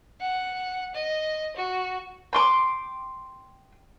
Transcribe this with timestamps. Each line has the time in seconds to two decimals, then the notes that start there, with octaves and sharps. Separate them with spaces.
0.21 F#5
0.95 D#5
1.56 F#4
2.33 G5 C6 D6